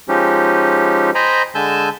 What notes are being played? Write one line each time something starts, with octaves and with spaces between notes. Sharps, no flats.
F3 G#3 C#4 D#4 G4
C5 D#5 G5 G#5 A#5 B5
D3 G#3 G#5 A5 E6 G6